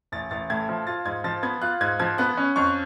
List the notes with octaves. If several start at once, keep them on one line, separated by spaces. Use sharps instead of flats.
A1 A6
A1 A6
A2 G#6
F3
F4 A6
G#2 G#6
F3 A6
B3 G#6
F4 F#6
G#2 G#6
F3 G#6
B3 F#6
C#4
F2 C#6